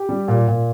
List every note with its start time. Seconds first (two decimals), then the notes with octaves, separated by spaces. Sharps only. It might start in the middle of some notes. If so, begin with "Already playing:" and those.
Already playing: G4
0.09 G3
0.28 A#2
0.47 A#2